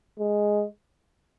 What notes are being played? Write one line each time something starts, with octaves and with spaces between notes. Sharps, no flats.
G#3